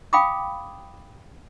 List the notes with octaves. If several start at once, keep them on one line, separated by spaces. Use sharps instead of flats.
F5 G5 B5 D6 D#6